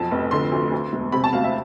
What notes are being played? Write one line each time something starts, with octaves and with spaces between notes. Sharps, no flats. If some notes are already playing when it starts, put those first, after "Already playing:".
Already playing: B1 F2 A5
F1
D3 C6
D2
D2
E1
C3 B5
A5
D2 F5
E5